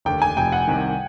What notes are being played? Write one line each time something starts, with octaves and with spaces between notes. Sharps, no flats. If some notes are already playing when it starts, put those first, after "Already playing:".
F1 D#2 D3 G5
G#5
F1 F2 C3 G5
F#5
C2 C3 D#3